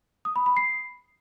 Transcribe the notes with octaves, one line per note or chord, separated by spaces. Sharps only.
D#6
B5
B5
C7